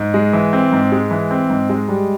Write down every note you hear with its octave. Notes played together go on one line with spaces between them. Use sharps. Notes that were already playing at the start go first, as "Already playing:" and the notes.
Already playing: G#2
G#3
E3
C4
G#2
G#3
E3
C4
G#2
G#3
G3